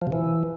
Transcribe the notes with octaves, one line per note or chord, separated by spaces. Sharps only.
F3
C3
E3